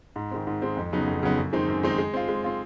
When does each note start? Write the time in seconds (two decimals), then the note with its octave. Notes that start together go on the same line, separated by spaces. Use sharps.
0.16 G#2
0.31 D#3 G#3 C4
0.47 G#2
0.62 D#3 G#3 C4
0.77 F2
0.92 C#3 F#3 B3 D#4
1.08 F2
1.23 C#3 F#3 B3 D#4
1.38 F#2
1.53 D#3 G#3 C4 D#4
1.68 F#2
1.83 D#3 G#3 C4 D#4
1.98 G#3
2.14 C4 F4
2.29 G#3
2.44 C4 F4